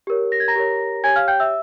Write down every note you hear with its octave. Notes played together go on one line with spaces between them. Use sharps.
G4 A#4 C#5
A#6
G#6
A#5 A#6
G4 A#4 C#5
G4 C#5 G#5 G#6
F5 F6
G5 G6
E5 E6